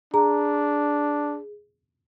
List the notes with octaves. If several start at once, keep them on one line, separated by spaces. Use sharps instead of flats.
D4 G#4 A#5